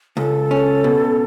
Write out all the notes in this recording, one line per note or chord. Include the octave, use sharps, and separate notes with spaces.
C#2 A4
C#4
B2